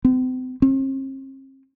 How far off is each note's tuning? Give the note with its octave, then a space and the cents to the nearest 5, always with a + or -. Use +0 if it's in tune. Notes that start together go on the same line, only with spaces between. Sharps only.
C4 -40
C4 +45